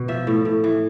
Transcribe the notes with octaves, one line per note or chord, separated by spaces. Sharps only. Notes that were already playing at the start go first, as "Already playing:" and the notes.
Already playing: B2
F3 E5
A2
A2
E3